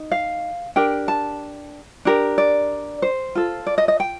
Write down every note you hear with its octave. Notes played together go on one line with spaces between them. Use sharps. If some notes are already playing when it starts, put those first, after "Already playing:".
Already playing: D#4
F5
D4 G4 A#4 G5
A5
D4 G4 A#4
D5
C5
F4 A4
D5
D#5
D#5
G5